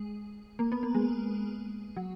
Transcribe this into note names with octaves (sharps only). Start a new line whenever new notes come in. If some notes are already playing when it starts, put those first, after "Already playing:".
Already playing: G#3
A#3
B3
A#3
G#3
F#3